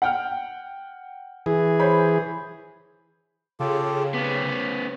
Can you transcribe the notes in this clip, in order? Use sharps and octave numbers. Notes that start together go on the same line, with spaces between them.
F#5 G5 F6
E3 G#4
C5 C#5 B5
C#3 F4 G4 A4
B3 C#4 G4